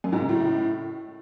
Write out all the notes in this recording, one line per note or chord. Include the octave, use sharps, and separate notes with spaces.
F#2
G#2
C#3
A2